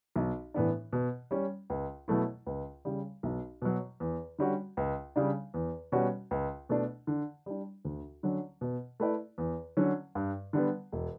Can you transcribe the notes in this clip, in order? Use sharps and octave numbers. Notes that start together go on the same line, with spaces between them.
B1
A2 E3 B3 D4
B2
G3 C#4
C#2
B2 F#3 A3 E4
C#2
C#3 G3
B1
B2 F#3
E2
D3 G3 C#4 F#4
C#2
C#3 G3 D4
E2
B2 G3 C#4 F#4
C#2
B2 A3 D4
D3
G3 D4
D2
D3 F#3 C#4
B2
A3 E4 B4 D5
E2
D3 F#3 C#4
G2
D3 G3 B3
E1